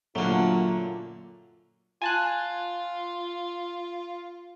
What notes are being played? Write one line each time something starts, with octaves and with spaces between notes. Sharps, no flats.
F#2 A#2 D3 F#3 A3 A#3 F4
F4 G#5 A5 F#6